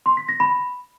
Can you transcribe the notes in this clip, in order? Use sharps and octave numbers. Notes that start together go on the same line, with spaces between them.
C6
B6
A#6
B5